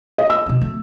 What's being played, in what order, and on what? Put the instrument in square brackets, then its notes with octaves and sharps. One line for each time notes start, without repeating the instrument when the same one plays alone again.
[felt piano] D#5
E6
[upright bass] B2 B3
A3